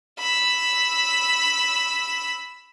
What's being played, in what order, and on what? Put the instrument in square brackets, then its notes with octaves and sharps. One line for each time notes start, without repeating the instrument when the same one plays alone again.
[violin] B5 E6